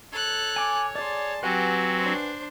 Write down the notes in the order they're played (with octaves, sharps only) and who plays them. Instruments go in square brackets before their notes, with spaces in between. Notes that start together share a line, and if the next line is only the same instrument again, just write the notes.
[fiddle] A4 F#6 [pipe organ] C#5
[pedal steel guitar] G#5 D6
[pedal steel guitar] G#4 D5 [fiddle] A5 C6
[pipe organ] F#3 C4 F#4 [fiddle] G4 [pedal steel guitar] B4 F#5 G#5
[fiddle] D4 C5